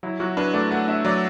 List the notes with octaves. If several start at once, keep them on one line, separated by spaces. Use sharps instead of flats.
F#3 E4
F#3 F#4
D4 B4
A3 D5
A3 F#5
D4 E5
F#3 D5